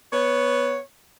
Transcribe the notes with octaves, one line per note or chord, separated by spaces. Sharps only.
B3 C#5